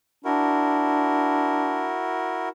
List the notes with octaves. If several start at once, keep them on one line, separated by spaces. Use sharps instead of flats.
D4 E4 F#4 A#4